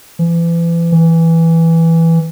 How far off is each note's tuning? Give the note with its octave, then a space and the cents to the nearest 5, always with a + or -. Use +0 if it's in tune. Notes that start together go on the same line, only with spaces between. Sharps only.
E3 +35
E3 +0